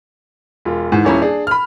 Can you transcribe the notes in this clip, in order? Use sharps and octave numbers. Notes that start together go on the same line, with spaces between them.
E1 F4
G#2 E3
D#1 C#4 E4 A#5
D4 G#4
B5 F6